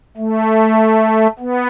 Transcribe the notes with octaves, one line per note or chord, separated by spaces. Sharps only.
A3
B3